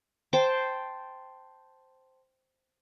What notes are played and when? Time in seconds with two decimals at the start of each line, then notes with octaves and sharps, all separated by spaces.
0.33 C5 G5 A5